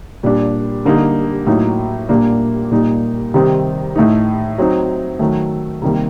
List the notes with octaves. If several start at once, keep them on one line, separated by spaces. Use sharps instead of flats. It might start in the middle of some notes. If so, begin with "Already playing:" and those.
A#2 G3 D4
D3 G3 A#3 D#4
A2 F#3 A#3 D#4
A#2 G3 A#3 D4
A#2 G3 A#3 D#4
C3 D#3 G3 C4 D#4
A2 A3 D#4
F#3 C4 D#4
D#3 F#3 A3
C3 D#3 G3 A#3